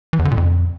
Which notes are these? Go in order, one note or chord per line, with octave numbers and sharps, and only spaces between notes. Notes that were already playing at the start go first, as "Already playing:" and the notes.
E3
E2
D3
A#2
F2